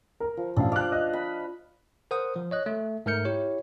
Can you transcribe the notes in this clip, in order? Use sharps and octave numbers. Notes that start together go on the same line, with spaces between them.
A#4
F3
A1 D4 F5
F5 D6 F#6
D#5
B5
A#4 C5 F#5 D#6
F3
C#5 D#5 F#6
A3
G#2 A3 A#4 F6 G6 C#7
E4 G4 C#5